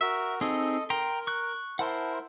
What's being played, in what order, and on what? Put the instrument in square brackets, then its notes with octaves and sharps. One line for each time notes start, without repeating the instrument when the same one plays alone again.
[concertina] F#4 A#4 [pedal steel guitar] E5
[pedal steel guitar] C4 D#4 G#4 [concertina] A4 D#5
[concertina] A#4 [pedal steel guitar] G5 A#5 C6
[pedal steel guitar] C#6 F#6
[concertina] E4 A#4 C5 [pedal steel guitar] F#5 A5 C6